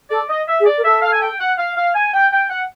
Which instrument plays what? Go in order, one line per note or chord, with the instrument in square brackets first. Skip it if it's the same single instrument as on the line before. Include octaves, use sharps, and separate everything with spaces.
[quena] A4 [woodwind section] D5
[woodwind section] D#5
E5
[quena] G#4
[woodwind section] D5
[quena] A#4
[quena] A4 [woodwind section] E5
[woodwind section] F5
G#5
G5
F#5
F5
F5
G#5
G5
G5
F#5